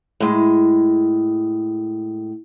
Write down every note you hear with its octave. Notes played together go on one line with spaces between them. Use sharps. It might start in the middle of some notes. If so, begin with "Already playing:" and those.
A2 G#3